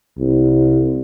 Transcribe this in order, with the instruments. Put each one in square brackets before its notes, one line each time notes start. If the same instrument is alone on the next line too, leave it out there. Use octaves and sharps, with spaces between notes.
[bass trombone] C2